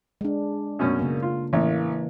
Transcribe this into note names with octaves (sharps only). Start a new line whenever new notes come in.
G#3 D4
F#2 B2 C#4
C#3 A#3
F4
A1 E3 A#3